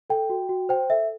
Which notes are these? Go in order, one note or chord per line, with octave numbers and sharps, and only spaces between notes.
A4 G5
F#4
F#4
C5 G5
A4 E5